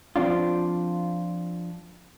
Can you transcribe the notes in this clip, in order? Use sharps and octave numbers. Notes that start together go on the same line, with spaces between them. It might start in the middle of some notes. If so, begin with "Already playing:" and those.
F3 C4 D4 F4